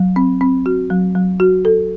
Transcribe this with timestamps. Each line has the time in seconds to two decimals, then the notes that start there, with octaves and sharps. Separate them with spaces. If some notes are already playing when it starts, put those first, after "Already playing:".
Already playing: F#3
0.16 C4
0.41 C4
0.66 F#4
0.90 F#3
1.15 F#3
1.40 F#4
1.65 A4